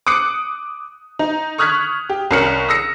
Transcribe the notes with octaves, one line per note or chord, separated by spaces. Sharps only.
D6 D#6 F#6 C#7
D#4
C#6 D#6 F6 F#6 G#6 B6
G4
C2 C#4 A#4 F6 C#7 F#7
D#6 E6 A#6 C#7